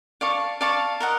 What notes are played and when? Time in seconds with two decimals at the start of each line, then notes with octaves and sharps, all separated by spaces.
0.21 D5 F5 A5 C#6
0.61 D5 F5 A5 C#6
1.00 A#4 D#5 F#5